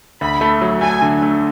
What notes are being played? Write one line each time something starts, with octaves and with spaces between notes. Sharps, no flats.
D2 B5
A3
F#3
A3 G#5
D3
A3